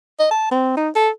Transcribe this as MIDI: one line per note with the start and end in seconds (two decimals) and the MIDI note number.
0.19 0.27 75
0.31 0.50 81
0.51 0.75 60
0.77 0.90 63
0.95 1.10 69